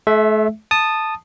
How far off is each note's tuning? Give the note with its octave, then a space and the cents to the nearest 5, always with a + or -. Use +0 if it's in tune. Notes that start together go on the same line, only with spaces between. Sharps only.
A3 -40 E5 +0
A5 +0 D#6 -15